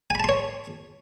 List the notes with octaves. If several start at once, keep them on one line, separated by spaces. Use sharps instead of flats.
C#5 G#5 A5 B5 C6